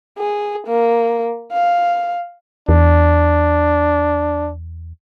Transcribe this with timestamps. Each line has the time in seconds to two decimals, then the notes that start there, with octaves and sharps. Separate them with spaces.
0.18 G#4
0.67 A#3
1.53 F5
2.69 E2 D4